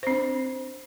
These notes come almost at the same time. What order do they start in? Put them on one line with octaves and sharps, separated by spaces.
C5 C4 D4